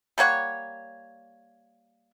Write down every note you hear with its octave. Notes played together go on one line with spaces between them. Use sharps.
G3 A#3 C#5 F#5